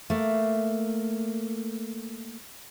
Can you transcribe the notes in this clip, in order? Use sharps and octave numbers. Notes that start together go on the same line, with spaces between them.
A3 A#3